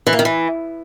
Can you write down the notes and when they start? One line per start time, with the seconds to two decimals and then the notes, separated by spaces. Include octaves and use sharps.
0.07 E3
0.13 A#3
0.19 D#3
0.25 E3